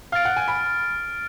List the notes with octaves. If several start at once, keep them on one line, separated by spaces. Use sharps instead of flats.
F5 F6 A6 D7
F#5
G#5
B5